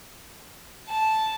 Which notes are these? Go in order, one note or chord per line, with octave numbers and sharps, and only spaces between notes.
A5